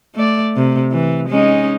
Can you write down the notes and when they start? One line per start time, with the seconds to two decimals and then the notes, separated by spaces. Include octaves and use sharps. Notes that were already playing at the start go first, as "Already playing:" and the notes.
0.15 A3 D5
0.56 C3
0.92 E3
1.29 G#3 C#4 D#4